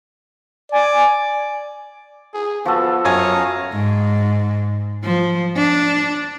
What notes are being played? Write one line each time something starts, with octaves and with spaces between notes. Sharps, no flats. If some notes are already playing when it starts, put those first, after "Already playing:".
D5 G#5
G#4
F3 B3 F#4 A4
F#2 C#5 F5 G#5 A#5 D#6 G#6
G#2
F3
D4